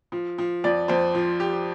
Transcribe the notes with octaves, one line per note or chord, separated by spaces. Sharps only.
F3
F3
F2 D5
F2 C5
F3
G4